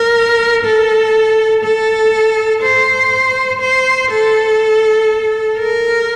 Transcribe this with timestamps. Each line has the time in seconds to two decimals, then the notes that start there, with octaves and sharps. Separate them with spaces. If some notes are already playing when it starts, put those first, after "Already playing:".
Already playing: A#4
0.64 A4
1.64 A4
2.63 C5
3.61 C5
4.11 A4
5.58 A#4